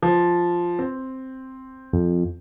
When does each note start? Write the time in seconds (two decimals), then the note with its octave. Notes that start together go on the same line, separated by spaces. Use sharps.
0.02 F3
0.79 C4
1.93 F2